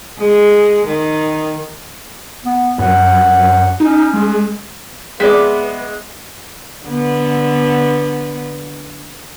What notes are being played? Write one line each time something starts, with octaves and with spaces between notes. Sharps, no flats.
G#3
D#3
B3
F#2 F#5
C#4 D#4
G#3
G#3 B3 C4 D5 E5 C6 D6
D3 B3